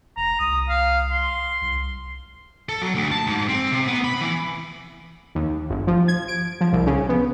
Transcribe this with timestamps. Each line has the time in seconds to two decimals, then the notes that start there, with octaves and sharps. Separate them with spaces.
0.16 F1 A#5
0.39 C2 D#6
0.68 F5
1.11 C6
1.61 C2
2.69 A4
2.82 F#3
2.95 D2
3.12 A5
3.27 G#2
3.49 C4
3.71 C3
3.87 B3
4.04 B5
4.21 E3
5.35 D#2
5.70 G1
5.87 F3
6.08 G#6
6.28 D7
6.61 F3
6.73 C2
6.87 C#3
7.09 B3